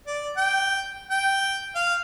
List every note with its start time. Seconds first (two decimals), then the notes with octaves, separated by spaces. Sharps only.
0.07 D5
0.37 G5
1.10 G5
1.75 F5